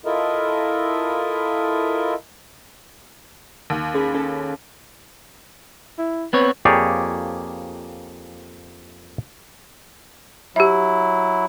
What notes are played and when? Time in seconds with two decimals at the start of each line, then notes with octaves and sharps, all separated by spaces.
0.06 E4 F4 A4 A#4 D#5 E5
3.70 D#2
3.94 C#4 G#4 B5
4.14 C#4 A4
5.98 E4
6.33 B3 C4 B4 C#5
6.65 F2 A#3 G4 G#4 C#5 D5
10.56 F#3 E4 G4 E5